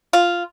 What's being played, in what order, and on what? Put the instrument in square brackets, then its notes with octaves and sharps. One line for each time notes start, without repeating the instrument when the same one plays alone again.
[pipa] F4